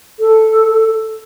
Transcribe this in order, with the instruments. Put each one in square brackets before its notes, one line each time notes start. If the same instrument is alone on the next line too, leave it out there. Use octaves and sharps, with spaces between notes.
[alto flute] A4